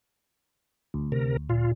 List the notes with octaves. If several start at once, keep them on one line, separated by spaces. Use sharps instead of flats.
D2
C3 A#4
A#2 F4